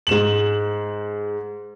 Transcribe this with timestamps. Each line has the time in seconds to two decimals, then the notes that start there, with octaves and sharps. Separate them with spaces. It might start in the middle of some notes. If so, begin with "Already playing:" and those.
0.07 G#2 E7 F#7